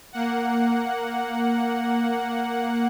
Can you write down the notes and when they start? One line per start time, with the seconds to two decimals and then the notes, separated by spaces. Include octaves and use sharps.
0.13 A#3 F#5